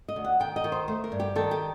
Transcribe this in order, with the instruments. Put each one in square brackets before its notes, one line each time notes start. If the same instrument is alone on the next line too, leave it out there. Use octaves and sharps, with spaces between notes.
[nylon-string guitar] D#5
D2
F#5
D#3 G5
D#5
D#3
C5
A3 C5
A#4
G2
G4
D#3 A4
G4